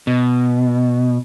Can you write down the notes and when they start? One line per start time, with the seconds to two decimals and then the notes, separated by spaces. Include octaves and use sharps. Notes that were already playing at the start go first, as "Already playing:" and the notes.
0.07 B2